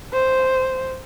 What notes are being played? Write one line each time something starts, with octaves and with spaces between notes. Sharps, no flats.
C5